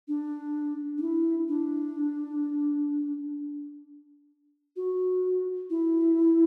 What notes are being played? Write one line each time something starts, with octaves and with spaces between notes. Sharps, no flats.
D4
D4
E4
D4
F#4
E4